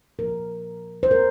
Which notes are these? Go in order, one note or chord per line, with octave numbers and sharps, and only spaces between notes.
A#2 F3 A#3 A#4
C5
A#4